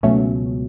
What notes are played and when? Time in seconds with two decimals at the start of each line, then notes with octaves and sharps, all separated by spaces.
0.03 C#2 B2 F#3 A3 B3 C#4